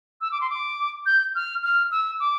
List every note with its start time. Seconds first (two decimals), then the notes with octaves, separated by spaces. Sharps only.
0.21 E6
0.32 D6
0.41 C6
0.50 D6
1.06 G6
1.35 F6
1.63 F6
1.91 E6
2.20 D6